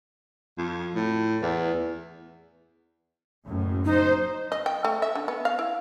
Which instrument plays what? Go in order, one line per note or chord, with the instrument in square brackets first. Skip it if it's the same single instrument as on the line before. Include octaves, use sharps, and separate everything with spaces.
[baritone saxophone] F2
A2
E2
[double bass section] F#1 F#2 A2
[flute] D#4 [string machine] C5
[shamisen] D#5
G5
A3
E5
D3
B3
F5
E4